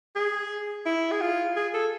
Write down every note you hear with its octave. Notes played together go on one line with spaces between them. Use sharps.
G#4
E4
G#4
F4
G#4
A4